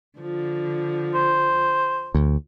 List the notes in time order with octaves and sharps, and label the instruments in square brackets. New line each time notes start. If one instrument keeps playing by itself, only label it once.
[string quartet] D3 F3
[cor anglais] C5
[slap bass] D2